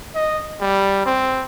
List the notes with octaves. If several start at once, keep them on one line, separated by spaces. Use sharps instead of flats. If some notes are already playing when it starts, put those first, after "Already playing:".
D#5
G3
C4